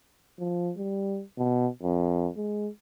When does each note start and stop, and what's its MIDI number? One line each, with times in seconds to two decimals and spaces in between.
0.39 0.72 53
0.77 1.22 55
1.38 1.68 47
1.83 2.29 41
2.37 2.68 56